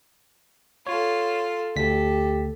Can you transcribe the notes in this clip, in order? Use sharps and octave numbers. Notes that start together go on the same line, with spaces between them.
F4 A4 C#5
D2 G4 A4 B6